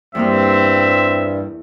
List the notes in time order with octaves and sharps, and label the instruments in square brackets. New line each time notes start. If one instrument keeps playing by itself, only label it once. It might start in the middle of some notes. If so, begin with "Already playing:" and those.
[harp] E2 A#3 F6 [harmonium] G2 G3 [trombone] C4 [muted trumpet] E5